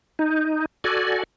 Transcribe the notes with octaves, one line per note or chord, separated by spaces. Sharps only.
D#4
F#4 A4 D5 G#5